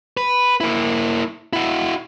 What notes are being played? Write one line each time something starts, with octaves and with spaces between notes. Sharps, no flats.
B4
A#3 E4
E4 F#4